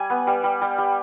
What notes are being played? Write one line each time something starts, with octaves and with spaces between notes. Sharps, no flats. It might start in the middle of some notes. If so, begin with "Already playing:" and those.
Already playing: G3 G#5
B3
G3
G3
G3
G3